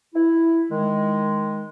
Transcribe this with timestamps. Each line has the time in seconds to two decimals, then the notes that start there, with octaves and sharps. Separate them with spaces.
0.14 E4
0.71 D#3 G#3